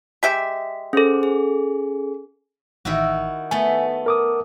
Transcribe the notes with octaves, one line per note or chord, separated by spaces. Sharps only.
G#3 G4 E5 B6
C#4 G#4 A4 C5
G#4
A1 D#3 E4 F#4
A3 B3 G#5
A#4 D6 D#6